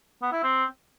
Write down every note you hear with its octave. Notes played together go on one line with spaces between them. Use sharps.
B3
E4
C4